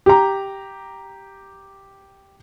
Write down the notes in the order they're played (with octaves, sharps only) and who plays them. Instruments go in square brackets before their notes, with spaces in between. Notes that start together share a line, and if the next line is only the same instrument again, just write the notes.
[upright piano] G4 A#5